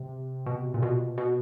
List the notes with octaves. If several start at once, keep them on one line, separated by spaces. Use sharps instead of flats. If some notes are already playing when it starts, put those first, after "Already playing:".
Already playing: C3
B2
A#2
B2
B2